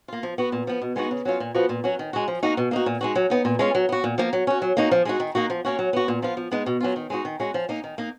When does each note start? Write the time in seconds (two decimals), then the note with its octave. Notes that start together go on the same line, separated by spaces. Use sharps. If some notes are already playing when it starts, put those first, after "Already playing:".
0.08 A#3 F4
0.23 F3
0.38 B3 F#4
0.52 A#2
0.67 F3 B3
0.81 B2
0.96 G#3 B3 D#4 F#4
1.11 C#3
1.25 F#3 C#4 F4
1.40 A#2
1.54 F3 B3 F#4
1.69 A#2
1.84 F#3 C#4 F#4
1.99 D#3
2.13 G#3 D#4 F#4
2.28 F3
2.43 A#3 D#4 F#4
2.57 B2
2.71 A#3 D#4 F#4
2.86 A#2
3.01 G#3 D#4 F#4
3.15 F#3
3.30 B3 D#4
3.45 A#2
3.59 G#3 C#4 F4
3.75 F#3
3.89 B3 F#4
4.04 A#2
4.18 F3 A#3
4.33 F#3
4.47 C#4 F#4
4.62 F#3
4.77 A#3 D#4 F#4
4.91 F3
5.05 G#3 D#4 F#4
5.20 D#3
5.35 A#3 D#4 F#4
5.50 F3
5.65 A#3 C#4 F#4
5.79 F#3
5.93 B3 F#4
6.08 A#2
6.22 F3 B3 F4
6.37 F3
6.51 G#3 B3 D#4
6.66 B2
6.80 F#3 C#4 F4
6.96 D#3
7.10 G#3 D#4 F#4
7.25 D#3
7.40 G#3 C#4 F#4
7.54 F3
7.69 A#3 D#4
7.84 D#3
7.98 A#3 D#4